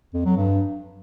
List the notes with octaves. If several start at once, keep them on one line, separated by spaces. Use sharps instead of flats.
F2
F#3
G2